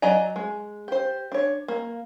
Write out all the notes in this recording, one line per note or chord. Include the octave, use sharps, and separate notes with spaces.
F#3 D5 D#5 G#5 A#5
G#3
G4 C5
D4 C#5
A#3